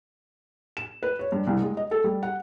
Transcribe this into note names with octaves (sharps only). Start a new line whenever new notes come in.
E7
B4
C#5
G2
C2
G#3
D#5
A4
G3
F#5